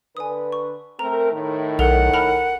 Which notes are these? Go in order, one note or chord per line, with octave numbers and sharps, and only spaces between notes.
D3 B4 G#5 D#6
C#6
A3 C4 A#4 A#5
A2 D#3
B1 A4 A#4 F#5 F7
A#4 A5 B5 F7